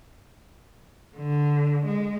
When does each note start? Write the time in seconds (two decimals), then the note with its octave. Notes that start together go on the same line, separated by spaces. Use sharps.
1.18 D3
1.86 G#3